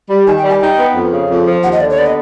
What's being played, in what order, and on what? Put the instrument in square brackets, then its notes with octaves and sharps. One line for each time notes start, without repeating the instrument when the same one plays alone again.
[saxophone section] G3
[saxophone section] D#3 [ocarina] G#5
[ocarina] G5
[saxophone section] G3
[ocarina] G#5
[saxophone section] D#4 [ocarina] G5
[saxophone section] B3
F2
C#3
F2
F3
[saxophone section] D#2 [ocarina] F#5
[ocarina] D#5
[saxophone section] D3 [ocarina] D5
[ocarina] C#5
[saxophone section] B3 [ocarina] D5
[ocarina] D#5